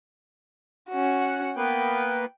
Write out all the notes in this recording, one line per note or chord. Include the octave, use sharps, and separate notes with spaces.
C#4 F#4
F#5
A#3 B3 B4 G5